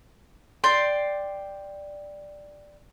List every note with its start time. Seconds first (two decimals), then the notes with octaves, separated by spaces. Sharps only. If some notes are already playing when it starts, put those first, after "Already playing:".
0.64 D5 G5 C6